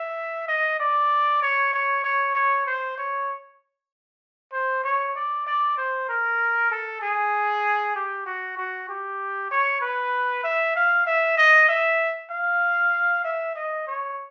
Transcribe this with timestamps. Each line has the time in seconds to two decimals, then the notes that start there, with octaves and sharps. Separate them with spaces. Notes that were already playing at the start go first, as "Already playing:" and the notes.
Already playing: E5
0.48 D#5
0.80 D5
1.42 C#5
1.73 C#5
2.04 C#5
2.35 C#5
2.66 C5
2.97 C#5
4.52 C5
4.84 C#5
5.15 D5
5.47 D5
5.77 C5
6.09 A#4
6.71 A4
7.02 G#4
7.95 G4
8.26 F#4
8.57 F#4
8.89 G4
9.51 C#5
9.81 B4
10.43 E5
10.75 F5
11.06 E5
11.37 D#5
11.68 E5
12.30 F5
13.24 E5
13.55 D#5
13.87 C#5